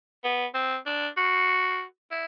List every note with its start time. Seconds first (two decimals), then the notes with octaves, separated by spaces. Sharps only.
0.24 B3
0.54 C4
0.86 D4
1.17 F#4
2.11 E4